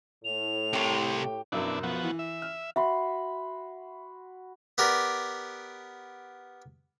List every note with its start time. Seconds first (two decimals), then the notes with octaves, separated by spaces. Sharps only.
0.25 A2 F7
0.73 C2 C3 G4 C#6
1.52 B1 F#2 B2 D4 E4
1.83 F3 B3 F#4
2.03 E3
2.19 E5
2.42 F6
2.76 F#4 E5 B5 C6
4.78 B3 G4 A#4 D5